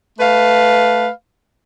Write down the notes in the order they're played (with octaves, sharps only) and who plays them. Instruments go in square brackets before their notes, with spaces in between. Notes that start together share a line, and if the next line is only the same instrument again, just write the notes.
[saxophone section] A3 B4 F5